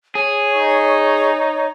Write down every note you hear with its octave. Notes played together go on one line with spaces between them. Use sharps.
G#4 C#5
D#4